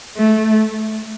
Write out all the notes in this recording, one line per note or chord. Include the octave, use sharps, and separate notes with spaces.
A3